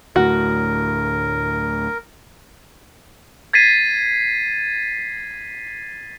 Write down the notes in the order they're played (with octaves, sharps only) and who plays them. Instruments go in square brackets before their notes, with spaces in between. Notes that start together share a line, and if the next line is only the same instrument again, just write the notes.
[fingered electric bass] D2 A2 [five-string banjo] F#4 [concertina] A#4
[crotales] G#6 A6 B6 C7 D#7